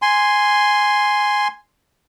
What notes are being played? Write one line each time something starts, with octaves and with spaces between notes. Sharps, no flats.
G#5 C6